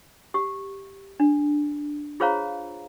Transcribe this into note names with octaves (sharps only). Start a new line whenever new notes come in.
G4
D4
F4 G#4 C5 C#5 F5 A#5